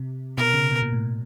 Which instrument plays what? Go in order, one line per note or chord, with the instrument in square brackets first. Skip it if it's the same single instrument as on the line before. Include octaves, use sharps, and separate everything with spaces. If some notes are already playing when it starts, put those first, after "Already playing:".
Already playing: [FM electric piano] C3
[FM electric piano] B2 [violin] A#4
[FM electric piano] C#3
B2
A#2
A2